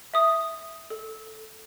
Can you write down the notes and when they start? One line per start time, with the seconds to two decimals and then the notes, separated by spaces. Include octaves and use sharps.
0.14 E5 D#6
0.90 A4